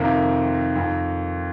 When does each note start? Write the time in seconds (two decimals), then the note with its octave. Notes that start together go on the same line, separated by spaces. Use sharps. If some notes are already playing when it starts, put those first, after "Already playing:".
Already playing: F2 C3 D#3 A#3
0.75 F2 D#3